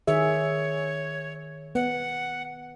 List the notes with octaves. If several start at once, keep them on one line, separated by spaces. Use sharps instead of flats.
D#3 G#4 C#5 E5
B3 F#5